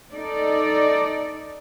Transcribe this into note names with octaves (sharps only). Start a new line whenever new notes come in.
D#4 A4 D5